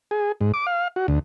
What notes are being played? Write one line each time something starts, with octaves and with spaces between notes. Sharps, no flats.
G#4
G#2
D6
F5
F#4
D2